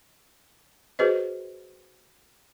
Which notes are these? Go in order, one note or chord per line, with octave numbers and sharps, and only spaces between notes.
F#4 G#4 B4 C5 D#5